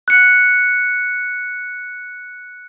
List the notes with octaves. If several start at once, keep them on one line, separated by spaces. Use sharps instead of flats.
F#6 C#7